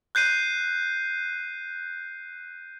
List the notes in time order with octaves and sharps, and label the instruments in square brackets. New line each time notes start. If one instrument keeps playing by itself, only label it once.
[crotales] F#6 G6 C7 D#7